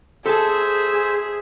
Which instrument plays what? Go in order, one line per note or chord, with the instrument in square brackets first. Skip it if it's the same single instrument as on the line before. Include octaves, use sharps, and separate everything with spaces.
[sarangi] G#4 [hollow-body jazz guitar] A4 A5 [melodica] C5 E5 E6